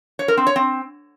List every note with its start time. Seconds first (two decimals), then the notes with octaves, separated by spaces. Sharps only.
0.19 C#5
0.28 A#4
0.37 C4
0.47 C#5
0.56 C4